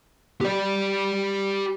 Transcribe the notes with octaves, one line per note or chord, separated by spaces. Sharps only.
G4 D5